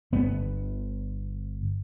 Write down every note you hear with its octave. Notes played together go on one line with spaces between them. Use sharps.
G1 B3